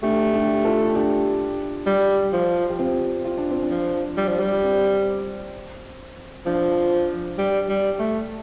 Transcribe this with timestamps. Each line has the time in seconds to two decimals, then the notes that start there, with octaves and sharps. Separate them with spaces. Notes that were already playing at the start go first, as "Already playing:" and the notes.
0.03 A3 D4 G4
0.34 D4 G4
0.64 F4 A4
0.95 D4 G4
1.86 G3
2.33 F3
2.69 G4
2.78 C4 F4
3.25 F4
3.38 D4
3.50 C4
3.63 D4
3.70 F3
4.17 G3
4.28 F3
4.39 G3
4.63 C4
6.46 F3 D4
7.38 G3
7.69 G3
7.99 A3